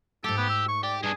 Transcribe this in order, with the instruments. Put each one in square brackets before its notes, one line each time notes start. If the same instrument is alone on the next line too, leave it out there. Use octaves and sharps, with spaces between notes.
[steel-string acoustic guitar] G#2 A3 [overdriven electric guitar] G4 [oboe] A4
[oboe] B3
E6
C#6
[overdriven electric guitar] G4 [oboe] D5
[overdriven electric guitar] G2 D4 [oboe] G#4